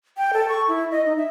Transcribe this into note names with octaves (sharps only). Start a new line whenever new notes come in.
G5
A4
C#6
E4
D#5
D#4
E5